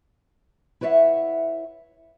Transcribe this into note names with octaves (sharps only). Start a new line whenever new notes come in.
E4 B4 C#5 D5 E5 F#5